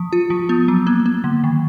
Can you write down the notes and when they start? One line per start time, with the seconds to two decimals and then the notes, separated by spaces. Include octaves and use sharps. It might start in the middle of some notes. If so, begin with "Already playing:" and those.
Already playing: F3
0.13 F4
0.30 F3
0.49 B3
0.68 F#3
0.87 A#3
1.06 A#3
1.24 D3
1.44 D#3